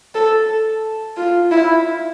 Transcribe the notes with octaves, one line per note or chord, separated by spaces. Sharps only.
A4
F4
E4